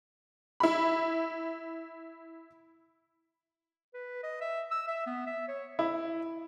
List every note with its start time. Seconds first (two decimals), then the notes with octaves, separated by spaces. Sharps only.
0.60 E4 B5
3.94 B4
4.23 D#5
4.41 E5
4.71 E6
4.88 E5
5.07 B3
5.27 E5
5.48 C#5
5.79 E4